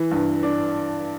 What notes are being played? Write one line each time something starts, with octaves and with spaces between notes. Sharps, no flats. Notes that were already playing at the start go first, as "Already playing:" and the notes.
Already playing: E3
G2
D4